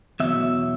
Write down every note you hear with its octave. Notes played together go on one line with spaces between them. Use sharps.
E2 B2 F#3 E5